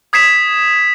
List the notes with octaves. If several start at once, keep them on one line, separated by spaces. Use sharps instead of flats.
D#6 G#6 B6 C7 E7